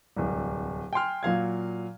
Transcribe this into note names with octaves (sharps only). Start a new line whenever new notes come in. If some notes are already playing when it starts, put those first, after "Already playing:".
D1 C2
G5 G#5 C6 F6
A#2 F#3 F5 G#6